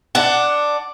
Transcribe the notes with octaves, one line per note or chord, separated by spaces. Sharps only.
D4 F#5